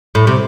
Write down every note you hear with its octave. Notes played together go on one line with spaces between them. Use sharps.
A2
C3